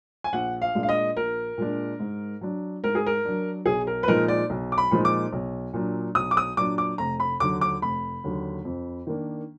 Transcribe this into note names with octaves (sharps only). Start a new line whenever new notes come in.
G#5
A#1 F#5
F5
A#2 G#3 D4
F5
D#5
A#1 A#4
A#2 G#3 D4
G#2
F#3 D4
G#2 A#4
G#4
A#4
F#3 D4
B1 G#4
A#4
B4
A#2 F3 G#3 D#4 A#4
D5
B1
D6
B5
A#2 F3 G#3 D#4
D6
B1
A#2 F#3 D4
B1 D#6
D6
D#6
A#2 F#3 D4 D6
D6
F1 A#5
B5
D#2 D3 F#3 D6
D6
F1 B5
D#2 D3 F#3
F2
D#3 A#3 D4